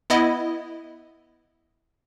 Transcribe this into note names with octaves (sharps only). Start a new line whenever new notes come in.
B3 E4 D#5